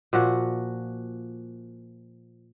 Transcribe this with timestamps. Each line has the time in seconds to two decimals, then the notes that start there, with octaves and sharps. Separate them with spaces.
0.13 A#2 F3 F#4